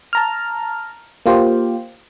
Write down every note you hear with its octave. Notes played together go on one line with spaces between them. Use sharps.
A5 A#5 F6
A#3 F4 G4 C5